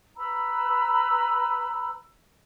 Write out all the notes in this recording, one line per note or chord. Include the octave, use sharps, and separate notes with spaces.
B4 A#5 B5 E6